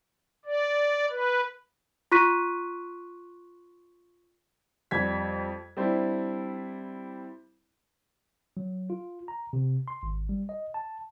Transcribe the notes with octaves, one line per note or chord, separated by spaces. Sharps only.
D5
B4
F4 C6 C#6 F#6 B6 D#7
F2 G3 G#6 B6
G3 C4 D4 E4
F#3
F4
A#5
C3
C6
G#1
G3
D#5
A5